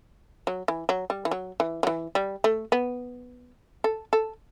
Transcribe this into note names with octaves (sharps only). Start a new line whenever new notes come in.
F#3
E3
F#3
G3
E3
F#3
E3
F#3
E3
G3
A3
B3
A4
A4